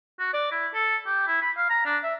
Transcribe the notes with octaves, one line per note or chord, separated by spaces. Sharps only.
F#4
D5
E4
A4
G4
E4
B5
F5
A#5
D4
E5